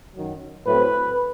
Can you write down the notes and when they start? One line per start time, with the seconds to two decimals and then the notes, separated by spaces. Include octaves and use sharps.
0.15 F#2 D#3 F#3
0.66 A2 F#3 A3 C4 B4